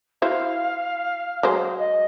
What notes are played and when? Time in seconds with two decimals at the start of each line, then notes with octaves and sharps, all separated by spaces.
0.22 E4 F#4 C5 F5
1.43 F#3 G#3 C5
1.79 D#5